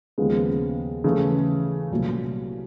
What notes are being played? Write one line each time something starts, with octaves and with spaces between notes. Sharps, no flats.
D#2 C#3 F3 G#3 B3
C#3 E3 A3
C2 A#2 F#3 A3